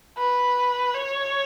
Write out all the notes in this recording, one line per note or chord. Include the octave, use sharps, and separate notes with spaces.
B4
C#5